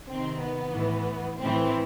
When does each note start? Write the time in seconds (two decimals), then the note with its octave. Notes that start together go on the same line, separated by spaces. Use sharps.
0.11 C3 D#3 C4
0.43 B3
0.76 A2 E3
1.40 A2 E3 C4